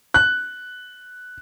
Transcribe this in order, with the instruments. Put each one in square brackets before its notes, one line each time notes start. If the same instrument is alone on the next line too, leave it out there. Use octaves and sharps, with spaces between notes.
[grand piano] F#6